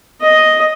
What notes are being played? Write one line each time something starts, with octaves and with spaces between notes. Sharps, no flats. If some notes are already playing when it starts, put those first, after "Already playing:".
D#5